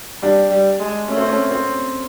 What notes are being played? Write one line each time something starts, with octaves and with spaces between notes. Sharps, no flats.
G3 D4
G3
G#3
A3 C#4
C4
C#4
C4